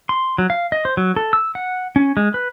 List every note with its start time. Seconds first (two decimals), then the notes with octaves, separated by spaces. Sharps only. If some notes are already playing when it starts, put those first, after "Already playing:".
0.09 C6
0.38 F#3
0.50 F5
0.72 D#5
0.85 C5
0.97 F#3
1.16 A4
1.33 E6
1.55 F#5
1.96 C#4
2.17 G#3
2.34 B4